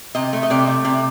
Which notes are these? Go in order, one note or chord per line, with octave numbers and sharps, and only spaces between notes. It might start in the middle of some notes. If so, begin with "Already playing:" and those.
C3 D#5
A3
D#5
C3 D5
A3
C3 D5